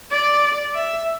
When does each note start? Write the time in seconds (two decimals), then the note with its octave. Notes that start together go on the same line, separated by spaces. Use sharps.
0.11 D5
0.75 E5